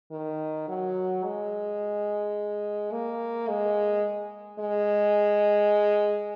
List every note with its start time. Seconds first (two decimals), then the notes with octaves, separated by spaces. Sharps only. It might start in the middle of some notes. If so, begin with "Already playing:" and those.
0.11 D#3
0.68 F#3
1.24 G#3
2.92 A#3
3.48 G#3
4.59 G#3